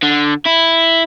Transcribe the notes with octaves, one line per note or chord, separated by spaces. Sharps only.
D3
E4